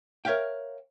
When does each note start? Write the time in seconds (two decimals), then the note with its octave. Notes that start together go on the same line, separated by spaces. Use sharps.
0.25 A#4 C#5 E5 F5 G5